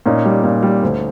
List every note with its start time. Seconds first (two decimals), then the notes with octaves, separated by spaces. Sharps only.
0.06 A#2 C#4 D#4
0.25 G3
0.44 A#2
0.63 G3
0.83 D2